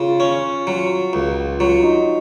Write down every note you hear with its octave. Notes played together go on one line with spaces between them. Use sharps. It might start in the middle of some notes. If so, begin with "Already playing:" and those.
Already playing: C#3 F4
C#4
F#3
C#2
F#3 F4
D#4